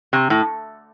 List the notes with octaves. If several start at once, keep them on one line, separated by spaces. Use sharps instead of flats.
C3
A2